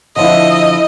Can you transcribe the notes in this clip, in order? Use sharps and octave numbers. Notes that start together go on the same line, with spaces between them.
D3 F3 E4 D#5